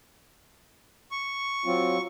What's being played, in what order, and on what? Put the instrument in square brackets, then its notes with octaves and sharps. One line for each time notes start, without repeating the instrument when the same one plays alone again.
[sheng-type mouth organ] C#6
[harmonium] F#3 C4 F4